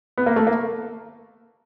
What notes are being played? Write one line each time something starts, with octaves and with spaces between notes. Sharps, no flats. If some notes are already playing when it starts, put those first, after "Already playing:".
B3
A#3
A3
A#3